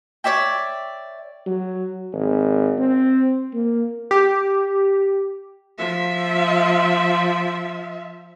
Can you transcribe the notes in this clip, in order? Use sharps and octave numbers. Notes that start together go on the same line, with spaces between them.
C#5 D5 E5 G5
F#3
G#1
C4
A#3
G4
F3 E5